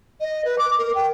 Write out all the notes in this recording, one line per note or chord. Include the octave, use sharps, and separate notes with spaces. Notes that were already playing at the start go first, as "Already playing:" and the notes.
D#5
B4
D6
A#4
G5